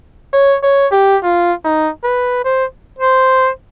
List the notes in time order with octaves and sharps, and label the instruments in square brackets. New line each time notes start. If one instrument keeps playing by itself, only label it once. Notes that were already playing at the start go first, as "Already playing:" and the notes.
[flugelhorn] C#5
C#5
G4
F4
D#4
B4
C5
[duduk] C5